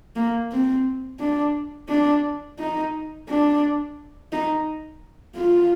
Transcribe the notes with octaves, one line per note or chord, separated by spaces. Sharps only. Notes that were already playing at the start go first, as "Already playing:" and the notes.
A#3
C4
D4
D4
D#4
D4
D#4
F4